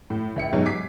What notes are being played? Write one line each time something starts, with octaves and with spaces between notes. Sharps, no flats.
A2
C#2 E5 C#7
G#2 B2 F#3 G#3
D6 G#6 B6 C7